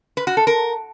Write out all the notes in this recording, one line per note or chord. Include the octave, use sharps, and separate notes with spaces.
B4
F#4
A4
A#4